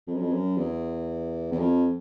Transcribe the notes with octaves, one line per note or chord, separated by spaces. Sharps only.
F2
F#2
F2
F#2
E2
E2
F2